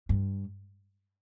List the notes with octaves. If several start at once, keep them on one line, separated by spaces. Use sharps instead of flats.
G2